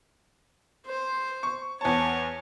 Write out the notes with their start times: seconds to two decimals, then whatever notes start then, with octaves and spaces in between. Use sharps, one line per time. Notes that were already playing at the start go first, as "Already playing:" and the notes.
0.87 C5
1.43 C#6
1.81 E2 C#5 A5